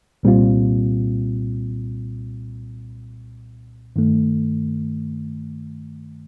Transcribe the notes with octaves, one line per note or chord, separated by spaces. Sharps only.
C2 A#2 G3 C4 F4
G2 D#3 A3